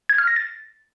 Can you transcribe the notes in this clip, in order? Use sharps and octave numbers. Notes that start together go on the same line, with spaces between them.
G#6
F6
A#6
A6